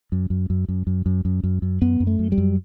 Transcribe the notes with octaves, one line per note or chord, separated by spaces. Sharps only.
F#2
F#2
F#2
F#2
F#2
F#2
F#2
F#2
F#2
F#2 B3
F#2
A3
F#2
G3
F#2